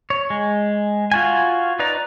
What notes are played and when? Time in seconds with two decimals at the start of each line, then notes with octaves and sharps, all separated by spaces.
0.10 C#5
0.30 G#3
1.12 F4 F#4 G#5
1.79 D#4 B4 D5 A#5